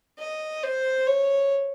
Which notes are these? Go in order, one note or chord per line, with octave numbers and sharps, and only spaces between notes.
D#5
C5
C#5